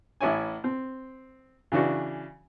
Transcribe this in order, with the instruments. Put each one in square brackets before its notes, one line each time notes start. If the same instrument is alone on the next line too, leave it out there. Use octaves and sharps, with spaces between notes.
[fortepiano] A1 E4 C#5 G#5
C4
C#3 E3 D4 F#4